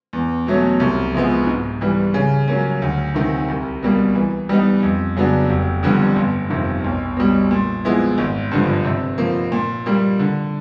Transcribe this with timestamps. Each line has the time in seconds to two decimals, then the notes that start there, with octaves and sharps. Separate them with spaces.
0.13 E2
0.47 B2 F#3 A3 C#4
0.80 C2
1.14 C3 F3 G#3 B3
1.47 G#2
1.81 E3 G3
2.14 C#3
2.48 F#3 A#3 C#4
2.82 D2
3.14 C3 D#3
3.48 C2
3.83 B2 G3 A#3
4.15 E3
4.49 G3 B3 D#4
4.83 F2
5.16 C#3 F#3 B3 D4
5.50 F1
5.83 F2 D3 G3 B3
6.16 G1
6.50 F2 C3 D#3
6.84 B1
7.17 B2 G3
7.51 A#2
7.85 F3 G#3 B3 E4
8.18 G#1
8.51 G2 D3 F3
8.85 C3
9.18 F3 A#3
9.52 A#2
9.86 G3 A#3
10.19 D3